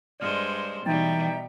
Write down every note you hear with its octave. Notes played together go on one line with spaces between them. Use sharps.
G2 G#3 C5 D5 F6 C#7
B2 E3 G3 D#4 E5 G5 A#5 A6